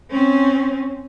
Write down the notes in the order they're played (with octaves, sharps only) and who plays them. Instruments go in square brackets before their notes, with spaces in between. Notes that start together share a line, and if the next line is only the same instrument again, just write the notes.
[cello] C4 C#4